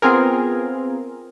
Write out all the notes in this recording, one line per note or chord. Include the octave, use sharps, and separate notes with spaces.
B3 C4 F4 G#4 A#4